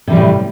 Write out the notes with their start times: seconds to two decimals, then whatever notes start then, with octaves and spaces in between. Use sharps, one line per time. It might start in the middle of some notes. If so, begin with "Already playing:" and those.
0.08 C3
0.10 E3
0.13 G3
0.15 A2